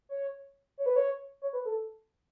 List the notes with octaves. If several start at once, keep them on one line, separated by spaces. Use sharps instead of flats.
C#5
C#5
B4
C#5
C#5
B4
A4